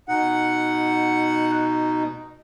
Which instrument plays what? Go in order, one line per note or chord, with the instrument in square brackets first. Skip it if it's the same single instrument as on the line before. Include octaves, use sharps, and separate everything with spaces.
[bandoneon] B2 D#4 [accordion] F#5